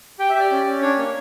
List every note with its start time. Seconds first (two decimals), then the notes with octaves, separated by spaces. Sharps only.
0.19 G4 G5
0.29 E5
0.35 G4
0.40 D5
0.51 C#4
0.67 C#4
0.82 D4 C#5
0.98 A#3